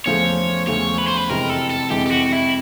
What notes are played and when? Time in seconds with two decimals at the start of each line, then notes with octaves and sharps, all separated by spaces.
0.06 E2 C#3 F3 A3 C#5
0.67 E2 C#3 F3 A3 C#5
0.98 B4
1.07 C5
1.17 B4
1.29 F2 C3 E3 G#3 A#4
1.49 A4
1.70 A4
1.90 F2 C3 E3 G#3 G4
2.06 G4
2.11 F#4
2.32 E4